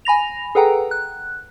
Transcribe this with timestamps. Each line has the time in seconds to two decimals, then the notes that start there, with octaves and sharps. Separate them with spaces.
0.05 G#5 B5 A#6 F7
0.55 G#4 A4 B4 F#5 G5 A#5
0.91 F#6